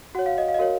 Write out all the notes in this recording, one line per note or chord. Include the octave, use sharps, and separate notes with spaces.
F#4 C#5 F#5
F5
D#5
F5
D#5
F#4 A#4 C#5 F5